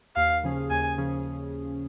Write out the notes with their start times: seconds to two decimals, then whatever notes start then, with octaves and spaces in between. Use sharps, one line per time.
0.16 D#2 F5
0.43 C#3 F3 C#4 G#4
0.70 D#2 G#5
0.98 C#3 F3 C#4 G#4